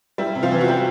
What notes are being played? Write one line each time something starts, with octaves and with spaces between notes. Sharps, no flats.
G3 E4
C3
F3 F4
E3
F#4
G3 G4